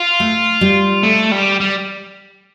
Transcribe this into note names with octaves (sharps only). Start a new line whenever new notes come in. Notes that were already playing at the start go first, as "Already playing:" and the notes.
Already playing: F4
A3
G3
A3
G3
G3